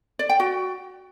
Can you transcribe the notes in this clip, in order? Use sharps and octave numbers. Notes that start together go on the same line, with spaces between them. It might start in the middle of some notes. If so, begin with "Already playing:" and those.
D5
G5
F#4